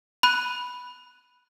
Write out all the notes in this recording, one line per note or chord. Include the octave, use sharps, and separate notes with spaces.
B5 F#6 D#7